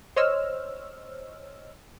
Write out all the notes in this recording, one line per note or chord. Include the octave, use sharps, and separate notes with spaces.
C5 C#5 D#5 E6 F6